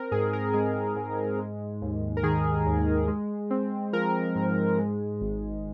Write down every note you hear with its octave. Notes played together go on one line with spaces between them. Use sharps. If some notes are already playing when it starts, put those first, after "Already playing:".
Already playing: C4 A#4
G#2 G#4
A#4
G#3 G#4
G#2
G#3
D#2
A#4
D#3 G#4
D#2
G#3
C4
F3 A#4
G#2
G#3
G#1